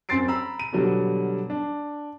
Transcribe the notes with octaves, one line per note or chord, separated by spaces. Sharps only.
F#2 C4 C6 A6 C7 D7
A#5 B5 E6
D#7
B2 D3 F#3 G3
D4